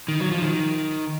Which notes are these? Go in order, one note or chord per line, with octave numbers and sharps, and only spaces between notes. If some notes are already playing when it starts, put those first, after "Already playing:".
D#3
F#3
F3
D#3